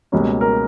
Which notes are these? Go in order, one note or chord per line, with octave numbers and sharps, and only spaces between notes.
C#2 B2 G3 A#3 C#4
A#4